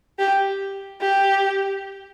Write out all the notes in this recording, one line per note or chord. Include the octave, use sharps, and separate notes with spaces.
G4
G4